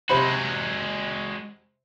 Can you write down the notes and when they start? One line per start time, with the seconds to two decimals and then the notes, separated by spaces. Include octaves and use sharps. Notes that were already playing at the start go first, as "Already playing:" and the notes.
0.09 C3 G#3 F#4 C5 B5